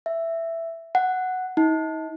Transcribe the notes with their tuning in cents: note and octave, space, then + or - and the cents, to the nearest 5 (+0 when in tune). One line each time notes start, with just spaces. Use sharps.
E5 +5
F#5 +0
D#4 +40